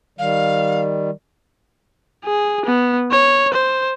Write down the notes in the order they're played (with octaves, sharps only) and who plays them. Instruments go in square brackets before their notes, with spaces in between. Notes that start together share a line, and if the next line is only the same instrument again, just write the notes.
[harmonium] D#3 G3 [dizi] F5
[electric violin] G#4
B3
C#5
C5